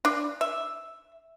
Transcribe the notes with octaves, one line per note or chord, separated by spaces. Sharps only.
D4
E5